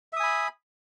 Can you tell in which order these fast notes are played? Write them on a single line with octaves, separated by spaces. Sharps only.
E5 D#6 G#5 B5